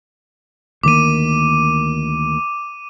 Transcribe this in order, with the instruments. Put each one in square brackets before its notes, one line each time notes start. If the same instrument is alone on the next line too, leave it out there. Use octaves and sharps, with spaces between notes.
[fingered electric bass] D2 D#3 A#3 [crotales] D6 D#7